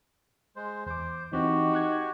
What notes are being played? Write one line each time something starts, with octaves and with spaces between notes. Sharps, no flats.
G#3 C5
E2 C5 D6
E3 C4 D#4 F#4 G4
C#6 F#6 G#6